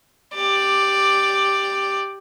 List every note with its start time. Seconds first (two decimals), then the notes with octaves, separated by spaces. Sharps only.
0.35 G4 D5